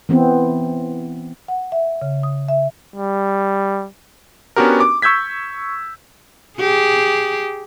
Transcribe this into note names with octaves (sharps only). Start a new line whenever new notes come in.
E3 B3 C4
F#5
E5
C#3
D#6
E5
G3
B3 C#4 D4 F#4 G4 A#4
D6
C#6 E6 G6 G#6 B6
G4 G#4